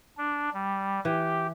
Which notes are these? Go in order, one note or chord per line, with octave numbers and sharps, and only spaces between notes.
D4
G3
E3 G4